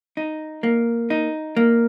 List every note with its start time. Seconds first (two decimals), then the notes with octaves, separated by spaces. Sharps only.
0.17 D#4
0.63 A#3
1.10 D#4
1.57 A#3